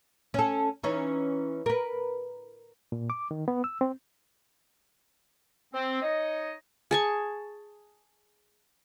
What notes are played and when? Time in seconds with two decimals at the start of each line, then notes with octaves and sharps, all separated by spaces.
0.34 C#4 A4
0.83 E3 C#4 D#4
1.66 A#4 B4
2.92 A#2
3.10 D6
3.31 D#3
3.48 B3
3.64 E6
3.81 C4
5.72 C4
6.02 D#4 C#5 D#5
6.91 G#4 A5 C#6